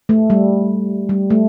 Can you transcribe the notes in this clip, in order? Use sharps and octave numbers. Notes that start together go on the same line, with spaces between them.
A3
G3
G3
A3